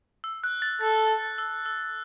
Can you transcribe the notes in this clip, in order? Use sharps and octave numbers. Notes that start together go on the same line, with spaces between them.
E6
F#6
A6
A4 A6
E6
E6